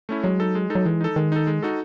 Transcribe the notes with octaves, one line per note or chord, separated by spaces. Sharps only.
A3 C#4 E4
F#3 G#3
D#4 A4
G#3
D#4 A4
F#3
E3 G#3
D#4 A4
D#3 G#3
D#4 A4
G#3
D#4 F#4 A4